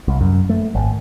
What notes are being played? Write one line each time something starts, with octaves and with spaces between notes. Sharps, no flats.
C2
F#2
A3
G#1